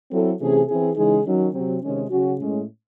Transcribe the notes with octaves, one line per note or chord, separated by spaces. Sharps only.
F#3 C4 E4 A4
C3 E3 A3 C#4 G#4
E3 C4 E4 G#4
C#3 E3 G#3 D#4 G#4
D#3 F#3 C#4
C3 F#3 C4
C3 D#3 G#3 C#4
C#3 F#3 C#4 F#4
A2 G#3 C#4